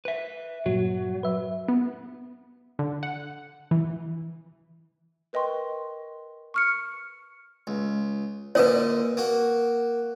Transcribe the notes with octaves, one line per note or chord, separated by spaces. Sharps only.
B4 E5
G2 A#2 F#3 F#4
B4 E5
B3
D3
F#5
E3
A#4 B4 D#5 G5 C6 C#6
C#6 F6 C#7
C#2
A#2 D3 B4 C#5 D#5
A#3 F#4